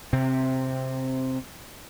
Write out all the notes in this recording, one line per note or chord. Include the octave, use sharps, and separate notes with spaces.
C3 C4